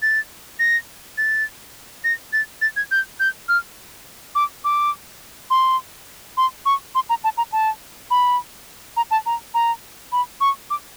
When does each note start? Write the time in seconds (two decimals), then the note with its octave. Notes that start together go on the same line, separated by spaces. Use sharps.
0.02 A6
0.59 A#6
1.17 A6
2.04 A#6
2.33 A6
2.61 A6
2.76 G#6
2.91 G6
3.20 G6
3.48 F6
4.35 D6
4.64 D6
5.50 C6
6.37 C6
6.65 C#6
6.95 C6
7.09 A#5
7.24 A5
7.37 A#5
7.52 A5
8.11 B5
8.97 A#5
9.11 A5
9.26 A#5
9.54 A#5
10.12 B5
10.40 C#6
10.70 D6